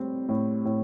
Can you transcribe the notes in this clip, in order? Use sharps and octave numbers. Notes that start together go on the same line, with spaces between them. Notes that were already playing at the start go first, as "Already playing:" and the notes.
Already playing: A2 G3 C4
A2
A2